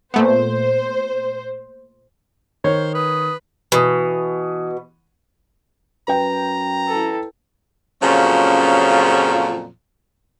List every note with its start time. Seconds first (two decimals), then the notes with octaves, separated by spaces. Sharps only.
0.14 A#2 A3 B3 C5
2.64 D#3 C5 C#5
2.94 B4 D#6
3.72 B2 E3 D#6
6.08 F#2 B4 G5 A#5
6.89 E4 A4
8.01 F2 A#2 C#3 F3 F#3 C#4